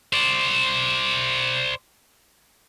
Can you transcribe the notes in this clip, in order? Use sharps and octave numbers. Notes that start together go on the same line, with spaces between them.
C5 D5